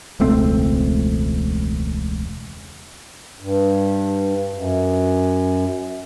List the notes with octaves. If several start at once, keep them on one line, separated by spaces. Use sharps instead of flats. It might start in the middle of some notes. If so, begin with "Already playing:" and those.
E1 C#2 A3 C4
G2
F#2